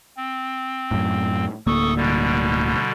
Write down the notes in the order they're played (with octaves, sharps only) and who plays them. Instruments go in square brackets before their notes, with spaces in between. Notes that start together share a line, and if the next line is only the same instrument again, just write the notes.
[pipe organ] C4
[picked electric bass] F#2 A2
[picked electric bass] D1 D2 A#3 [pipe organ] A4 C#6 D#6
[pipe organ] B2 D3 G3